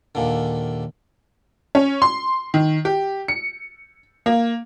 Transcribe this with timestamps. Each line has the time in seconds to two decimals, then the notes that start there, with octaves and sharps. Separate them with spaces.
0.15 D#2 A#2 D3
1.75 C#4
2.02 C6
2.54 D#3
2.85 G4
3.28 C#7
4.26 A#3